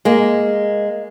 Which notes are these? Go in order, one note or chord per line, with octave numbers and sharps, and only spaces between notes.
G#3 A#3